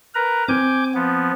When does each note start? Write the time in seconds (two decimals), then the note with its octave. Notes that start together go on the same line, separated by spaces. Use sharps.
0.15 A#4 B4 A#5
0.48 C4 G#5 D6 G6
0.94 F3 B3